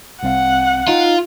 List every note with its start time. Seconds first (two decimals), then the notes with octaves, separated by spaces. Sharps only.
0.23 C2 C4 F5 F#5
0.88 D#4 F4